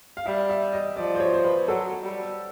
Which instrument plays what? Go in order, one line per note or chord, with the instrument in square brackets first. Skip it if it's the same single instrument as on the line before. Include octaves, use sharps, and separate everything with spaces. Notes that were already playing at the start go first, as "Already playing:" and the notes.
[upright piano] F5
[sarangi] G3 [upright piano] E5
[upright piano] E5
D#5
[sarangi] F3 [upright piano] D5
[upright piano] C5
C#5
C5
B4
[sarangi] F#3 [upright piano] A4
[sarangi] G3